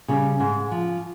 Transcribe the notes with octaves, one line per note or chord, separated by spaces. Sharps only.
C#3 G3
G#2
F3